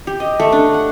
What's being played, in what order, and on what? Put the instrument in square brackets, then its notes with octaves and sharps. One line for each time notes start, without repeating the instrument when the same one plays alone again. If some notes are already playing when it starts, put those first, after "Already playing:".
[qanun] G4
D#5
A3
D4
F#5